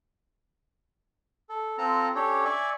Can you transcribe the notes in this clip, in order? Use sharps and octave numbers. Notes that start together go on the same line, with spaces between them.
A4
C4 F4 A4 A5 A#5
C#4 D4 G4 A4 C#5
D5 E5 G#5 C#6